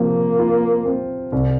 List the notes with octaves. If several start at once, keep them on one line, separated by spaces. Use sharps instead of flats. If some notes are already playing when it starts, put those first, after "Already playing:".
Already playing: C3 F3 A#3
F4
C4
C2